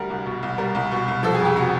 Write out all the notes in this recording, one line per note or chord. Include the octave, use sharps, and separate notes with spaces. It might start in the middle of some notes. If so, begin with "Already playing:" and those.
Already playing: D2 G3 A#4
C2
B2
C2
G3 A#4
C2
B2
C2
F3 A4
G#4
F2
G4
C3 F#4